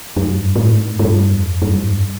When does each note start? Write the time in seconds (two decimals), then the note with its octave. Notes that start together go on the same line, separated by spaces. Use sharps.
0.16 F#2
0.36 G2
0.56 A2
0.75 G#2
0.99 G#2
1.04 G2
1.33 F2
1.62 G2
1.72 F#2
1.83 G#2
1.93 G2